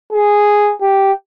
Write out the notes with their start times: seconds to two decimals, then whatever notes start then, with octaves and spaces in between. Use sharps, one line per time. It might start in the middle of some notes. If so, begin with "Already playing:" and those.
0.13 G#4
0.81 G4